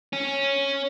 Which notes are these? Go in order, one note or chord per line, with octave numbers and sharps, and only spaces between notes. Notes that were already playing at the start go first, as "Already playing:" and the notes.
C#4